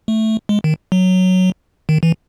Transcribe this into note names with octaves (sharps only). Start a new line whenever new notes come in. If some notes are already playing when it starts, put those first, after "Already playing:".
A3
G#3
D#3
F#3
D#3
E3